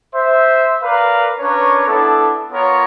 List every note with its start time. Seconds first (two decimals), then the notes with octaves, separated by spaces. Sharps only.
0.15 C5 E5
0.82 A#4 B4 D5 F5
1.40 C#4 D4 A#4 B4 C#5
1.87 B3 D4 E4 A4
2.51 B3 F4 A#4 C#5